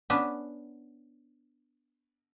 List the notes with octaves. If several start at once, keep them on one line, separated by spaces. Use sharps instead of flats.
B3 C#4 D4 B4